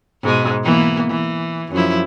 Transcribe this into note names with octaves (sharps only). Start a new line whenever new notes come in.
G#2 B2 G#3
E3 A#3 B3
E3
F#2 F3 E4